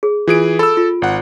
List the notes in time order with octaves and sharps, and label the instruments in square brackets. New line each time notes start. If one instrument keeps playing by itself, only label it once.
[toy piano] G#4
[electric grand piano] E3 G#4 D7 [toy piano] F4
[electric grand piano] A4 E6 [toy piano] B5
[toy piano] F4
[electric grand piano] G#1 F#5